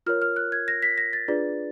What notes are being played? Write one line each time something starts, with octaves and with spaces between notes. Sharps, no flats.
F4 A#4 C#5 F6
F6
F#6
G#6
A#6
B6
A#6
A6
D4 F4 G#4 B4 D5